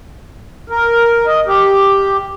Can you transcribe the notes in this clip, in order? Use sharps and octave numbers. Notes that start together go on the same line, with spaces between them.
A#4
D#5
G4